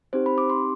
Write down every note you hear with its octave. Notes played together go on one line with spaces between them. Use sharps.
C4 D#4 G4 C5
B5
D6
C6